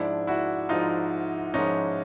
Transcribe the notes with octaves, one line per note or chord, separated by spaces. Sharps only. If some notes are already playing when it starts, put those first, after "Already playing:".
Already playing: G#2 F3 G#3 D4 E4
E4 F#4
G#2 F3 G#3 D#4 F4
G#2 F3 G#3 C#4 D#4